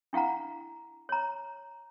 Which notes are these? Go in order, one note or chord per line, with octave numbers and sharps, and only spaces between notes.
D4 E4 F5 F#5 A#5
C#5 A#5